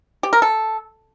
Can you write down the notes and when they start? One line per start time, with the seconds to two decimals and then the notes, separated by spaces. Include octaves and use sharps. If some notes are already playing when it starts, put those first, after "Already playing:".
0.23 G4
0.33 A#4
0.42 A4